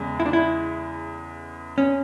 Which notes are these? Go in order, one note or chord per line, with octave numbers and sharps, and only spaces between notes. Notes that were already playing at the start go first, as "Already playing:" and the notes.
Already playing: E2 C#3 G#3
E4
D4
E4
C#4